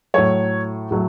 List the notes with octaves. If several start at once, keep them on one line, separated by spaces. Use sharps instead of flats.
A2 F#3 A3 C#5
A2 F#3 A3